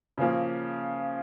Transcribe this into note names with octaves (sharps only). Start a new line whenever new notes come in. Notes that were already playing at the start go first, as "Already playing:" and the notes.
C#3 F3 A#3